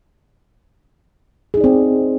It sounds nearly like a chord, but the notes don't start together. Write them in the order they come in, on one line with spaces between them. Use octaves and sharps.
G#4 D#4 D5 C4